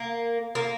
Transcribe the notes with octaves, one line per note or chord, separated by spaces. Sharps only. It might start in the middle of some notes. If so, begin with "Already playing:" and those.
Already playing: A#3
A#3